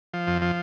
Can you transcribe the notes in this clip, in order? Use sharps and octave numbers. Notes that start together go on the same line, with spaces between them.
F3
F2
F3